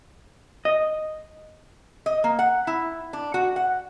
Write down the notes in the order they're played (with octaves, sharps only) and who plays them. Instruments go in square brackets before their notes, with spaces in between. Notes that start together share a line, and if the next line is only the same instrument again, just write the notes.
[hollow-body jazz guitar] D#5
[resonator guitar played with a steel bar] D#5
A#3
F#5
E4
D4
F#4
F#5